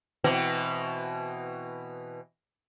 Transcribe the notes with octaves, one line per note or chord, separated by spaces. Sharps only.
B2 E3 C4